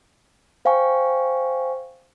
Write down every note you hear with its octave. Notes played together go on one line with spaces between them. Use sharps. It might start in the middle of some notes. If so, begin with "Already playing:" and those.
C5 F5 G5 G#5 C#6